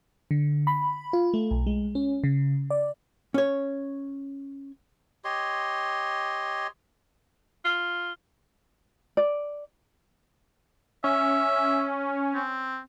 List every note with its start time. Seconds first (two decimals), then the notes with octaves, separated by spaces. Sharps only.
0.31 D3
0.67 B5
1.13 F4
1.34 A3
1.51 B1
1.67 G#3
1.95 C#4
2.24 C#3
2.70 D5
3.34 C#4 C#5
5.25 G4 C#5 D#5 C6
7.65 F4
9.17 D5
11.04 C#4 E5
12.34 C4